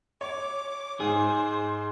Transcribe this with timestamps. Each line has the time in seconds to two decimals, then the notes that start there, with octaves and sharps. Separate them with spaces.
0.21 C#5 D6
1.00 G#2 G#4 C5